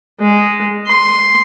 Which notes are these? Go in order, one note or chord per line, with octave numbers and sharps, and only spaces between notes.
G#3
C6